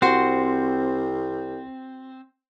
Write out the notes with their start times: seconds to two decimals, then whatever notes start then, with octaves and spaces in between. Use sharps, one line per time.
0.02 C2 C4 F#4 C5 F#5